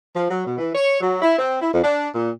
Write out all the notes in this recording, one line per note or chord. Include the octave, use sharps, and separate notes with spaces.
F3
F#3
B2
E3
C#5
F#3
E4
C4
E4
F2
D4
A#2